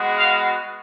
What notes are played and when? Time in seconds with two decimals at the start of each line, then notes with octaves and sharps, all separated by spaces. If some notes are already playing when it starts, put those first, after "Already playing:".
Already playing: G#3 B3 F#4
0.17 F5